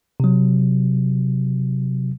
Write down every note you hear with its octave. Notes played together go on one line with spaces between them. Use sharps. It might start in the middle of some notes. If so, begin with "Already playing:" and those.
C3 F#3